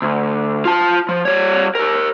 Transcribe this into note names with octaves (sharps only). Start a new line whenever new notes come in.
D2
F4 A5
F3
G3 C#5
G4 A#4